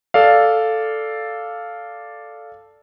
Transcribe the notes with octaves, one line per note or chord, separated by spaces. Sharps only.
A4 D5 F5